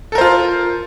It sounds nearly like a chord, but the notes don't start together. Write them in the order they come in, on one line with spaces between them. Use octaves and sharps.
A4 A#4 C5 F4